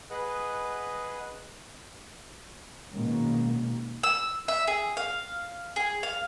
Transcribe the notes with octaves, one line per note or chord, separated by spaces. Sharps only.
G#4 B4 D#5 F#5
B2 D#3 G#3 A#3 C#4
E6
E5
G#4
F5
G#4
F5